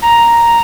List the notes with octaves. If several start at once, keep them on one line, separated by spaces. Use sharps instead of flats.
A#5